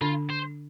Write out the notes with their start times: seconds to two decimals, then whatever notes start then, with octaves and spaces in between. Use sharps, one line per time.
0.01 D3 D4 F4
0.30 C5